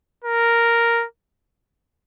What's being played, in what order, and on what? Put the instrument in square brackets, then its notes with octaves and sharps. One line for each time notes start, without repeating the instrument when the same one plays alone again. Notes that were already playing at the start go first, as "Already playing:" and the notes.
[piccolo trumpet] A#4